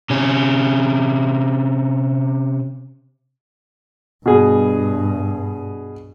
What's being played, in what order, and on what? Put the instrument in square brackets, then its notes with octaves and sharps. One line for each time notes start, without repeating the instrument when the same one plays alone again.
[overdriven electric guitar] C3 C#4
[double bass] G2 [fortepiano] B2 G#4